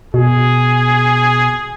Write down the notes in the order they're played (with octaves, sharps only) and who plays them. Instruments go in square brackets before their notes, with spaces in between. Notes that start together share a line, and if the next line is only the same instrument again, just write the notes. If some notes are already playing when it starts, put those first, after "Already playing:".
[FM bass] B2 [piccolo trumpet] G#4